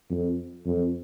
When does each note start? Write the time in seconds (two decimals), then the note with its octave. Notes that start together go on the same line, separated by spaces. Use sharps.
0.10 F2
0.66 F2